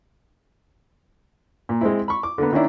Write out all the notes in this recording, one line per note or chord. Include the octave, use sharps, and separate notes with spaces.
A#2
G#3 C4 E4
B5 C#6
D6
D3 A#3 B3
D#3 A#3 C#4 D4 E4